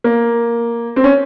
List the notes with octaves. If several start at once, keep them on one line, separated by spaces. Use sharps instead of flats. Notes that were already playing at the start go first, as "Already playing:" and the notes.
A#3
C4
C#4